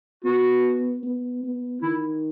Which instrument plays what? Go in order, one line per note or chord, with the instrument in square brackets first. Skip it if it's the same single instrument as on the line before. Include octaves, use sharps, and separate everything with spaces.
[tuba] B3 [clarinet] F#4
[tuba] B3
B3
[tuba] D#3 [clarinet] E4